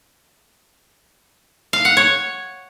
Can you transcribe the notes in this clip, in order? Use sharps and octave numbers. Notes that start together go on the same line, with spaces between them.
F5
F#5
C#5